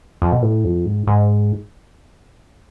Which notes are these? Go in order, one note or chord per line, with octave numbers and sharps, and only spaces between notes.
F2
B2
A2
F2
G#2
G#2